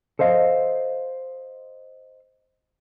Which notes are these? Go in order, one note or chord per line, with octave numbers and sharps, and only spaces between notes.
A4 C5 D#5 F5